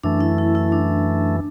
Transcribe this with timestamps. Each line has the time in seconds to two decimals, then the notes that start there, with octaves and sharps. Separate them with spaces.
0.03 F#2 E3 A3 D4
0.21 E4
0.38 E4
0.55 E4
0.72 D4